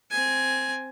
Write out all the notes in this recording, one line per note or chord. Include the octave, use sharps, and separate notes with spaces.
C4 G#5